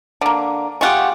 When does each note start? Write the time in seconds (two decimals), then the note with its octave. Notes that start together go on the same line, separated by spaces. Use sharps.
0.21 D3 A#3
0.81 G#3 F4 G4 F#5 C#6